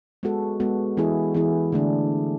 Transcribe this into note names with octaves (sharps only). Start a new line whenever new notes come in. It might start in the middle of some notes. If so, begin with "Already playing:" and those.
G#3 B3 F#4 A4
G#3 B3 F#4 A4
E3 B3 E4 G#4
E3 B3 E4 G#4
D3 A3 D4